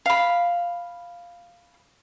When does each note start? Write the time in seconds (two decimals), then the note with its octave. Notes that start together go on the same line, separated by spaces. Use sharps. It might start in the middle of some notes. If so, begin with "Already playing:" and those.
0.06 F5 B5